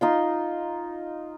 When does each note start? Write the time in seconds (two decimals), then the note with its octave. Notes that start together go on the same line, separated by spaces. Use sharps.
0.01 D#4 F4 C6